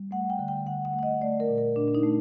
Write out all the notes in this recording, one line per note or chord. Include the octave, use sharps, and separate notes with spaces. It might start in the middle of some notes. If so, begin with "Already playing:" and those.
Already playing: G3
A3 F#5
G5
D3
G5
D3 F#5
F#5
A3
F#5
D#5
A3 D5
A#4
A#2
A#4
A#2 D4
D4
D#4
A3